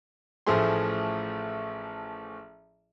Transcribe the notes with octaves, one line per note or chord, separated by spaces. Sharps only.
A1 A2 F3 A3 G#4 C6